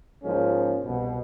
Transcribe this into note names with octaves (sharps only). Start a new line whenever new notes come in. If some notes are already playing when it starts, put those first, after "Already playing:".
G#2 F3 G#3 A#3 C#4
C2 B2